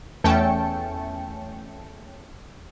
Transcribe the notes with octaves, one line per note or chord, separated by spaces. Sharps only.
E2 A3 C#4 G5 A5 C#7